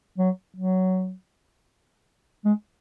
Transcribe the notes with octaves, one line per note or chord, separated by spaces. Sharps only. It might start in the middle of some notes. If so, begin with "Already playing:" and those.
F#3
F#3
G#3